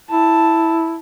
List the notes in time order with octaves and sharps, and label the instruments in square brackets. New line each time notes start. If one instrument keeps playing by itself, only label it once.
[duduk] E4 [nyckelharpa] A5